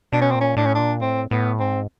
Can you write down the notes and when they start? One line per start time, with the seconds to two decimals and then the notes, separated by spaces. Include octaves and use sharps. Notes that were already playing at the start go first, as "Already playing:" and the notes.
0.13 B2 D4
0.21 C#4
0.31 A#2 C4
0.41 C#4
0.57 A2 D4
0.66 C#4
0.75 A#2 D4
1.01 A2 C4
1.31 A2 B3
1.60 G#2 C4